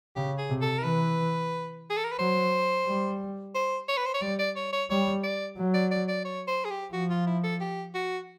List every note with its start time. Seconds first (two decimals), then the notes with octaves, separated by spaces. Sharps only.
0.16 C#3 G4
0.38 G#4
0.50 C3
0.61 A4
0.78 A#4
0.83 E3 B4
1.90 G#4
1.97 A4
2.04 A#4
2.12 B4
2.19 F#3 C5
2.87 G3
3.55 C5
3.88 C#5
3.97 B4
4.06 C5
4.14 C#5
4.21 G3 D5
4.39 D5
4.56 C#5
4.73 C#5
4.90 G3 C#5
5.24 D5
5.58 F#3
5.74 D5
5.91 D5
6.08 D5
6.25 C#5
6.48 C5
6.65 G#4
6.70 G4
6.93 F3 F#4
7.10 F4
7.26 E4
7.44 A4
7.61 G4
7.94 F#4